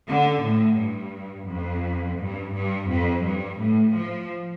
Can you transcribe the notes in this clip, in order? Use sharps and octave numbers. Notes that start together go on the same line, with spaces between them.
D3
A2
G2
F2
G2
G2
F2
G2
A2
F3